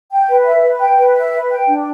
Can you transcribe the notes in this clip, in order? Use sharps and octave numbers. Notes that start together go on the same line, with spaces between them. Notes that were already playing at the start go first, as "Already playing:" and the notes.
G5
B4
E5
B4
G5
B4
E5
B4
G5
D4